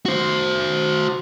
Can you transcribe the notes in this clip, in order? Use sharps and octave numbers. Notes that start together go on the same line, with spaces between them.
F#4 C5